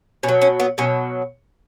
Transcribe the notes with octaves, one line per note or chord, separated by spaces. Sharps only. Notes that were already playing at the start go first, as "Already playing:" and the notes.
B2 C#4
F#3
C#4
B3
B2 F#3 C#4